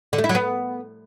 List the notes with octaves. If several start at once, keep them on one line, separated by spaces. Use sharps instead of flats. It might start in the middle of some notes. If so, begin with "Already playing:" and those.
D3
A3
E4
F#3
B3